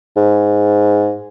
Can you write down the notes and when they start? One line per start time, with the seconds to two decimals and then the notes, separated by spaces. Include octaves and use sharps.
0.17 G#2